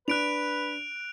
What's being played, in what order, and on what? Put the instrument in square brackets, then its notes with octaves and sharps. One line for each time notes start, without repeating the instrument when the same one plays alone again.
[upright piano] D4 [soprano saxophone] B4 [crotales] F#6 D7 F7